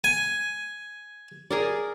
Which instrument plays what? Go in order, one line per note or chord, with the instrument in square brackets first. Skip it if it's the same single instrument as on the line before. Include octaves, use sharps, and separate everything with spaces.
[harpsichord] G#5
[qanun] G#4 A#4 D5